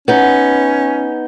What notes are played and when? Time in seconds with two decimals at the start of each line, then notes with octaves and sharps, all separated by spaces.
0.08 B3 C#4 D#4